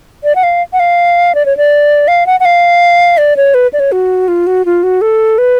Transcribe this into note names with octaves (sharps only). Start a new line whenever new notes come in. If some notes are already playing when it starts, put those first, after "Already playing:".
D5
F#5
F5
F#5
F5
D5
C#5
D5
F5
F#5
F#5
F5
D5
C#5
B4
D5
C#5
F#4
F4
F#4
F4
F#4
A4
B4